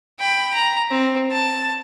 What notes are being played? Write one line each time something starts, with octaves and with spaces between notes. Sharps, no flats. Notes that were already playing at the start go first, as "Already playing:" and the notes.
G5 B5
A#5
C4
A5